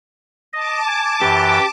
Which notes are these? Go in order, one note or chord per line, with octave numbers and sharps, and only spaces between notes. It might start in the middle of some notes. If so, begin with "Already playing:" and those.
D#5 A5 D6
G#5
F#2 E3 G4